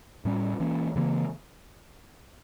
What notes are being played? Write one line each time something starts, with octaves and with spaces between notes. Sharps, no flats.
A2 G3 C#4
E3 A#3 C#4
C#3 E3 A#3